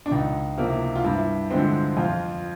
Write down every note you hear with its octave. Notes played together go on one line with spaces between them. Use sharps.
D4
C#2 D#4
C3 F3 A#3 E4
F4
G2 E4
D3 F3 G#3 C4
F2 F4